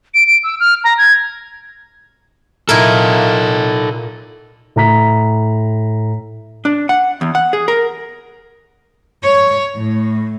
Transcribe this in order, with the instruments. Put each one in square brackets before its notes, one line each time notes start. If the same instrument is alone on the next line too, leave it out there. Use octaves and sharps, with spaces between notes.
[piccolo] D7
D7
E6
F6
A#5
G#6
[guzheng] A#2 E4 A#4 [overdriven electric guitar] D#4 A4
[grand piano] A2 A#5 B6
[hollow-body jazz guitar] D4
F#5
E2
F#5
G#4
A#4
[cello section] C#5
A2